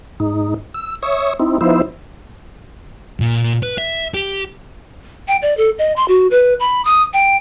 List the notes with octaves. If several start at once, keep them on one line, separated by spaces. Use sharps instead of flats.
G#2 D#4
E6
C#5 E5 C#6 D#6
C4 D#4 E4
F3 B3 D#4 E4 C5 E5
A#2
B4
E5
G4
G5
D5
A4
D#5
C6
F#4
B4
B5
D#6
G5